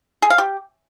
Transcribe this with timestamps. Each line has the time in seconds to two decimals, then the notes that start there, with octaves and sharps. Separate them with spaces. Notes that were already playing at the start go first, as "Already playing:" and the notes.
0.22 G#4
0.30 F5
0.38 G4